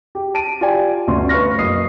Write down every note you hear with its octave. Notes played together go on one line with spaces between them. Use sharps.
G4
A5 D7 D#7
F4 G4 D5 G#5
G1 D2 C#4 C6
B4 C#5 F5 C#6 F6 A#6
F#1 B1 D#6 C7